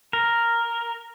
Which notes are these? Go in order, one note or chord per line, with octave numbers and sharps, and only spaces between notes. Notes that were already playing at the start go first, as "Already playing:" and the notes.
A#4